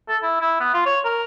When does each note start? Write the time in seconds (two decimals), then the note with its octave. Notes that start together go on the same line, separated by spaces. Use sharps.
0.09 A4
0.22 E4
0.40 E4
0.60 B3
0.74 F4
0.86 C#5
1.05 A#4